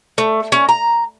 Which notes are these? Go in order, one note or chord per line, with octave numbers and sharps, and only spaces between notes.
A3
C#4
A#5